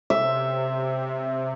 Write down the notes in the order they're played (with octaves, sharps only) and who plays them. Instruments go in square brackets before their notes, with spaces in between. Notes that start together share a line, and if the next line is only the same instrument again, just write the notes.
[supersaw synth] C3 [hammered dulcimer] E5